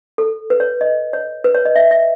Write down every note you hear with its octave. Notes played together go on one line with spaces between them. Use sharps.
A4
B4
C#5
D#5
C#5
B4
C#5
D#5
E5
E5